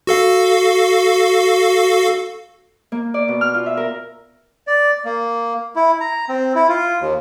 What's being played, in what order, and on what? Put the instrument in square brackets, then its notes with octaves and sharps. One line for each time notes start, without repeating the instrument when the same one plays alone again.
[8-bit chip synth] F#4 A4 F5
[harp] A#3
D5
B2
F6
F4
E5
A#4
[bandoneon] D5
A#3
E4
A#5
C4
E4
F4
D#2